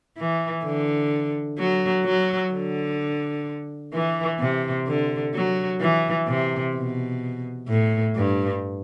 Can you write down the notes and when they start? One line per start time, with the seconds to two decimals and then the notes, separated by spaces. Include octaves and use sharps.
0.18 E3
0.65 D3
1.58 F#3
2.05 F#3
2.52 D3
3.93 E3
4.40 C3
4.87 D3
5.34 F#3
5.81 E3
6.27 C3
6.75 B2
7.68 A2
8.16 G2